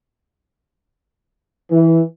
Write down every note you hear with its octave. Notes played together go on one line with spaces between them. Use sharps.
E3